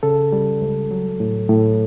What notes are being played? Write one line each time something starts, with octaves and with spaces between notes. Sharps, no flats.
C#3 A4
G3
C#2
F#3
A2
A2